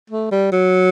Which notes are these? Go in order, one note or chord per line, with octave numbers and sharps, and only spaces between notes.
A3
G3
F#3